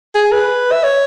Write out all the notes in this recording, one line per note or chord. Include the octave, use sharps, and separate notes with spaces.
G#4
B4
E5
C#5